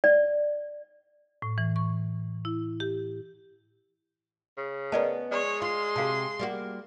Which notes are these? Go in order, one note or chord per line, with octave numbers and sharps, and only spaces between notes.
D5
A2
E3
C#6
E4
G4
C#3
B3 C#4 A#4 D5 D#5 A5
G#3 C#5 D5 C#6
F4 C6
C3 F#4 G#4 F5 A5
G3 A#3 F#4